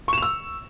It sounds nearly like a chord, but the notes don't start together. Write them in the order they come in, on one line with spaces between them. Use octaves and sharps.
C#6 E7 F7 E6